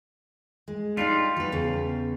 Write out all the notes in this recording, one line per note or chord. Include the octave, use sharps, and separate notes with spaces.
G#3
G3 D4 D#4 F4 D5
F#3 B4
E2 C#3